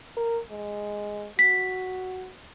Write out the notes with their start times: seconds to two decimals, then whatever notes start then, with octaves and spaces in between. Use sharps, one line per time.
0.17 A#4
0.51 G#3
1.39 F#4 B6